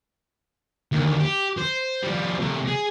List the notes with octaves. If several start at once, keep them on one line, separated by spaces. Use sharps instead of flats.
D2 D#3
G4
C5
F3 G3
A2 C3
G#4